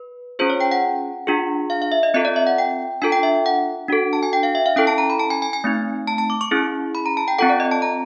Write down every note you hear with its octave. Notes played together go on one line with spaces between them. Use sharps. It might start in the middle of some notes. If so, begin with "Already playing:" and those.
Already playing: B4
C#4 F4 G#4 C5
C#5
G5
F#5
D4 F4 G#4
F5
F5
E5
D#5
C4 F4 A4 D#5
D5
E5
F#5
G5
D4 F4 A4 G#5
G5
E5
F#5
D4 F#4 A4
A5
G#5
G5
F5
E5
F5
C#4 E4 A4 G5
A5
A#5
B5
A5
G#5
G#5
G#5
A3 C4 D#4
A5
A5
D6
C#6
C#4 E4 G#4
B5
A#5
A5
G5
C4 F4 A4 F#5
D5
D#5
A5
A#5